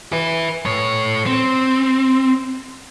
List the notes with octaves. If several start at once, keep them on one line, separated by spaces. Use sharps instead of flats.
B4 E5
A3 C#5
C4